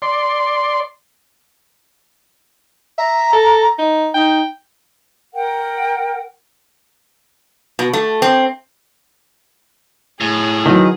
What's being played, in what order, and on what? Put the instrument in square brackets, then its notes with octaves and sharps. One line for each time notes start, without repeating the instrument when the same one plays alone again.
[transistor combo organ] D5 C6
[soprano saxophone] E5 [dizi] A#5
[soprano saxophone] A4
D#4
[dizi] D#4 [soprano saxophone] G5
[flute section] A#4 F#5 G5
[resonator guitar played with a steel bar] B2
A3
C4
[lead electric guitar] A2 [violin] G#4
[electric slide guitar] D#3 [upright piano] E3 F#3